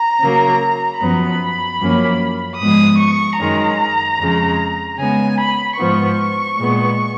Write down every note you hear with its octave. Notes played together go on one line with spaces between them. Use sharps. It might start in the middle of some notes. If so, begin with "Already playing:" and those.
Already playing: A#5
C#3 F#3 A#3
F#2 F3 B3 B5
F#2 F3 A#3 C#4
G#2 F3 G#3 B3 D#6
C#6
F#2 D#3 G#3 A#5
F2 C#3 G#3
C#3 G#3 B3 G#5
B5
G#2 F3 B3 C#6
A#2 G#3 B3